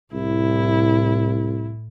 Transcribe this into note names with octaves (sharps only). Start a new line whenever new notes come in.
C2 A2 E4